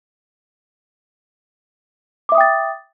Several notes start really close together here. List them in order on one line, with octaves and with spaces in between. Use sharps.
D6 E5 D#6 G5 A6